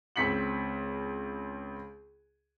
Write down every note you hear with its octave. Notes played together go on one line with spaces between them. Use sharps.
C#2 C4 B6 C#7 F#7